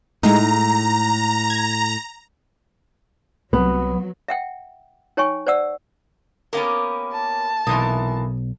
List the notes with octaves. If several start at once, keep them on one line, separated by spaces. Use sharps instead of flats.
A2 G#3 D#4 A#5
G#6
C2 C3 F#3 B3
E5 F#5 G5
D#4 C#5 G5 G#5 C#6
C5 D5 F#5 E6
A#3 B3 C#4 G4 A#4 D6
A5
B1 C3 E3 A#3 D#6